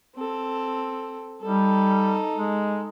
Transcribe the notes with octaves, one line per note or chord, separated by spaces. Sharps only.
C4 A4
G3 D#4 A4
G#3